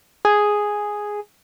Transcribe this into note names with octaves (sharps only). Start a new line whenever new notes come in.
G#4